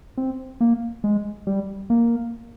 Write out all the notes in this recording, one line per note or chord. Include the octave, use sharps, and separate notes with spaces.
C4
A#3
G#3
G3
A#3